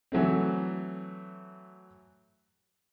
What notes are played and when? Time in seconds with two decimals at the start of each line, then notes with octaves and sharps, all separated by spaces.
0.12 E3 F#3 A3 C4